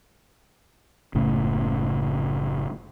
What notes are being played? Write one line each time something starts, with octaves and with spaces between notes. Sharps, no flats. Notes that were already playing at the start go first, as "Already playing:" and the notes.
F#1 A2 C#3